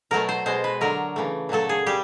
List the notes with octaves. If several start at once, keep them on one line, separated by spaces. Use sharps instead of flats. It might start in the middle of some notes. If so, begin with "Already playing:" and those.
B2 F#3 A3 A#4
C5
B2 G#3 C5
B4
D3 F#3 A3 A#4
C#3 E3 A3
A#2 F#3 A3 A4
G#4
G3 G4